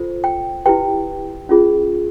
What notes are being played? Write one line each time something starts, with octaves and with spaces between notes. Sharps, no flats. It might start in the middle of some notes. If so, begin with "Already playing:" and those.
Already playing: F4 A4 C5
G5
E4 G4 B4 G5
C#4 F4 G#4